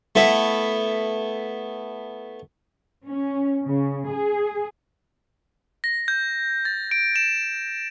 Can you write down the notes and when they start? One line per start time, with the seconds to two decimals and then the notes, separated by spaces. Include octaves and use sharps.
0.15 A3 B3 E4
3.09 C#4
3.66 C#3
4.11 G#4
5.84 A#6
6.08 G6
6.65 A6
6.91 D7
7.16 E7